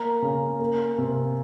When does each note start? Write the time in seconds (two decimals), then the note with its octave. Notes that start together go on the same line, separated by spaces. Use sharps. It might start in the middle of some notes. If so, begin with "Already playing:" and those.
Already playing: A#3 A#5
0.22 C#3
0.59 A#3
0.98 C3